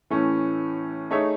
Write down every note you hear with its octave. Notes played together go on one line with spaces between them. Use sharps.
A2 E3 A3 C#4
A3 D#4 G#4 C#5 E5